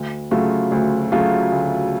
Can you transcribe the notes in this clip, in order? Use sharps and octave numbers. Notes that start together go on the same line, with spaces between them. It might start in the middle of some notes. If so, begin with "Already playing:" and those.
Already playing: D2
C#3 F#3 A3 F4
D2
C#3 F#3 A3 F4
D2